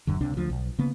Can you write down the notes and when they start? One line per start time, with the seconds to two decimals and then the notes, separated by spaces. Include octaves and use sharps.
0.07 E1 F#2 D3
0.21 C#2 C3 D4
0.37 D2 F3
0.50 B1
0.79 C#3 A#3 B3